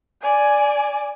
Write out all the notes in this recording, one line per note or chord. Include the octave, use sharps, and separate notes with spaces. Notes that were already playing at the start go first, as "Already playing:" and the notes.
D5 G#5